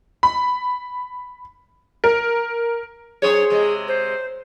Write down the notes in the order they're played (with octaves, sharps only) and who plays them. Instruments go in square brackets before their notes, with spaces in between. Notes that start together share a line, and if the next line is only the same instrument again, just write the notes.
[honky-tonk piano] B5
A#4
[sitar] F#2 C5 C#5 [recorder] G#4
[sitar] C3 G#3
[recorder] C5